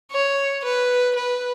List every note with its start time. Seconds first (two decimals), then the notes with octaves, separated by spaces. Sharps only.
0.12 C#5
0.64 B4
1.16 B4